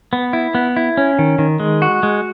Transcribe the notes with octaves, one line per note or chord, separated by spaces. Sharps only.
B3
E4
B3
E4
C#4
D#3
D#3
G#3
F#4
G#3